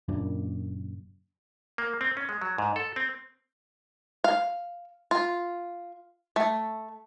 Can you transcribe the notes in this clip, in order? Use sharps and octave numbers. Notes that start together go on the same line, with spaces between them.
F#1 F#2 A#2 D4
A#3
C4
C#4
G#3
F#3
G#2
A4
C4
F5
F4
A3